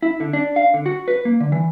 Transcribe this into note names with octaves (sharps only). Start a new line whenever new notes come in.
E4
D3
D4
F5
D3
F#4
B4
A#3
D3
E3